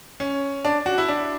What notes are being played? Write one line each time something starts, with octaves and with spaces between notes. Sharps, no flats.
C#4
D4
F#4
E4
D4